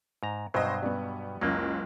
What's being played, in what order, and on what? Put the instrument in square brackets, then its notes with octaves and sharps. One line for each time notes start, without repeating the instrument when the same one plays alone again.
[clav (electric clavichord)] G#2 A#5
[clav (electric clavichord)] G2 B2 F#3 [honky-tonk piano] C5 D#5
[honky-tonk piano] G3 B3
[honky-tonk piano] F#1 C#2 [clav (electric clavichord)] F#3 A#3